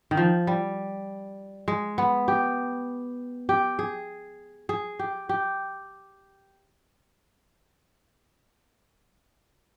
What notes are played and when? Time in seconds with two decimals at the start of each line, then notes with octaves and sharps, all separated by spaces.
0.11 D#3
0.17 F3
0.47 G3
1.68 G#3
1.98 B3
2.28 G4
3.49 G4
3.79 G#4
4.69 G#4
4.99 G4
5.29 G4